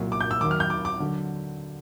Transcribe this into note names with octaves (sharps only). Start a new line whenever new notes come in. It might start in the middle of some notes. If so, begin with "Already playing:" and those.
Already playing: C2 A#2 F#3
D6
G6
E6
D#2 D#3 F#3 D6
F6
G6
D6
D6
D3 F#3